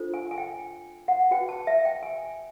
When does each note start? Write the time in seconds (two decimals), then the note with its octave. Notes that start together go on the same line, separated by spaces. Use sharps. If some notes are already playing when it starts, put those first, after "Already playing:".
Already playing: D4 F4 A4 C5
0.14 G#5
0.31 G#5
0.38 G5
1.08 F#5
1.31 F#4 B4 G5
1.49 A5
1.67 E5
1.85 G5
2.03 G#5